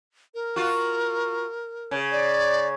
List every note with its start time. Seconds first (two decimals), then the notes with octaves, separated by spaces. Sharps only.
0.34 A#4
0.56 F4 F#4
1.91 C#3
2.12 D5